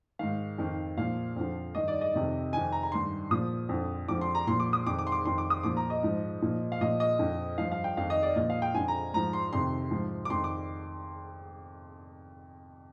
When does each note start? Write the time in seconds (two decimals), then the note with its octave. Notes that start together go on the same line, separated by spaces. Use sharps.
0.19 G#2 D#3 F5
0.58 F2 D#3
0.97 A#2 F3 F5
1.36 F2 D3 F3
1.75 G2 D#3 D#5
1.88 D5
2.01 D#5
2.14 F2 C3 D#3
2.53 F2 D#3 G#5
2.72 A#5
2.83 A#5
2.92 G2 D#3 C6
3.31 A#2 F3 D#6
3.69 F2 D3 F3
4.08 F2 D3 F3 D6
4.21 C6
4.35 A#5
4.47 A#2 F3 C6
4.60 D6
4.73 D#6
4.87 F2 D#3 D6
4.99 D6
5.07 C6
5.12 D6
5.25 F2 D#3 C6
5.38 D6
5.50 D#6
5.63 A#2 F3 D6
5.77 A#5
5.90 D#5
6.03 G#2 F3
6.42 A#2 F3
6.72 F5
6.81 A#2 F3 D#5
7.00 D#5
7.19 F2 D3 F3
7.58 G2 F3 F5
7.72 F5
7.84 G5
7.97 F2 D#3 F5
8.10 D#5
8.23 D5
8.36 A#2 F3 D#5
8.50 F5
8.62 G5
8.74 F2 D3 F3 G#5
8.88 A#5
9.13 G#2 F3 A#5
9.33 C6
9.53 F2 C3 D#3 C6
9.91 G#2 F3
10.25 D6
10.30 F2 C6
10.34 D#3
10.44 D6